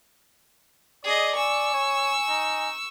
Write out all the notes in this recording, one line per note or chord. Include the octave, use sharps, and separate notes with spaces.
G#4 D5 D#5
G#5 C#6 E6
C#5
D#4